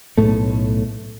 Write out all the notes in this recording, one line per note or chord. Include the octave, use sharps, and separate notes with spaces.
B1 A2 A3